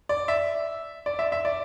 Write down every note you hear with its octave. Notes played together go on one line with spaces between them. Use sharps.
D5
E5
D5
E5
E5
D5